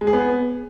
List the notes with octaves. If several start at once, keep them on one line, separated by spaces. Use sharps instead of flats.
G#3
G#4
B3